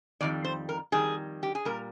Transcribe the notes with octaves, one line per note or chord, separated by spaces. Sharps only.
F2 D#3 G3 D5
C5
A#4
F2 D#3 G3 G#4
G4
G#4
A#2 G3 A#4